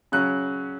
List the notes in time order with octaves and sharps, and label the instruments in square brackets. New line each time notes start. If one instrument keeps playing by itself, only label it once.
[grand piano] C#3 F#3 C#4 F#6